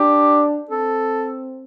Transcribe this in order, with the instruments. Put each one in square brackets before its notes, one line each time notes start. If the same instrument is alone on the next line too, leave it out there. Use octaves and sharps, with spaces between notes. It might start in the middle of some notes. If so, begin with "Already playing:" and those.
Already playing: [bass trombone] D4 [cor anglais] G4
[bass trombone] C4 [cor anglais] A4